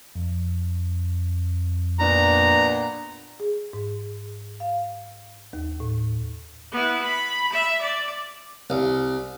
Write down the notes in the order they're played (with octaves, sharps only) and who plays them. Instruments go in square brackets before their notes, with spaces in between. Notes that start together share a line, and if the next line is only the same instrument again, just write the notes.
[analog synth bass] F2
[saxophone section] A#2 B3 D4 [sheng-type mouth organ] A#5
[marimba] G#4
G#2
F5
D#2
A2
[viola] B3 E4
B5
E5
D5
[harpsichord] C2